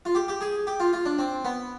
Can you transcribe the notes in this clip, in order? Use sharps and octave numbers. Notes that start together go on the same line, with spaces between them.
F4
G4
G4
G#4
G4
F4
F4
D4
C4
B3